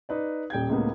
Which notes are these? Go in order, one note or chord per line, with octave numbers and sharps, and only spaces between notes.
D#4 B4 D5
D#1 G5 G6 G#6
C#2 A2 A#3 B3